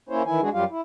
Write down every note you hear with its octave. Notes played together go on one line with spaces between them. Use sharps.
A#3 C#4 E4 C5 C#5
D#3 E3 E4 G#5
G#3 D4 F#4 G#4
F#2 F#3 G3 F4 G4 F5
E4